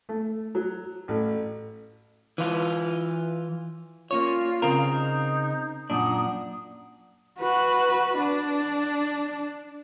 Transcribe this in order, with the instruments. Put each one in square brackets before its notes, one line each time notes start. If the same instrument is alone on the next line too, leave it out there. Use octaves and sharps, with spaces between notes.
[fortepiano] A3
F#3
A1
[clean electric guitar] E3 F4
[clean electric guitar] A#3 C#4 C#5 [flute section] F4 D5 F5
[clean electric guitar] C#3 C4 A#4
[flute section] D#4 G6
[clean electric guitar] F#2 A#2 D4 [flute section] F#5 A#5 D#6
[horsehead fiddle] F#4 B4
D4